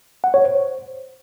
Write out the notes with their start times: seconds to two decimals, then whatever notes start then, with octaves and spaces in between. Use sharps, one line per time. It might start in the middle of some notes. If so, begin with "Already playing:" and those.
0.24 F#5
0.34 C#5
0.44 C5